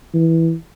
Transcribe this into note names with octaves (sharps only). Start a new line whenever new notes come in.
E3